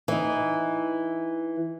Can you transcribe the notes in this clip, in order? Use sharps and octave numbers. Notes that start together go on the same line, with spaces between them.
E3 D#4